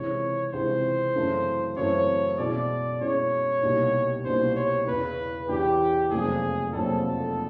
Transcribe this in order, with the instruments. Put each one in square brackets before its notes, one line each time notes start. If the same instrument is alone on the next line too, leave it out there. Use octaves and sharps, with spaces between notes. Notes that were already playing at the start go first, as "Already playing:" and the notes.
Already playing: [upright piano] C#2 C3 E3 G#3 [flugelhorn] C#5
[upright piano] C#2 C3 E3 G#3 [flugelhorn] C5
[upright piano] F#2 C#3 E3 A3 C4
[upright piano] F#2 C#3 E3 A3 C4 [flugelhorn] C#5
[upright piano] B2 G#3 C#4 E4 [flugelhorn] D5
[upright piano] B2 G#3 C#4 E4 [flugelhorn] C#5
[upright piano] C2 B2 G3 A#3 D#4
[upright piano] C2 B2 G3 A#3 D#4 [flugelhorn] C5
[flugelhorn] C#5
[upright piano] E2 C#3 E3 [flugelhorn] B4
[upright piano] E2 C#3 E3 [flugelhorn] G4
[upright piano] F1 F2 C#3 F#3 A#3 [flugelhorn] G#4
[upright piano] F1 F2 C#3 F#3 A#3 [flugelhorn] A4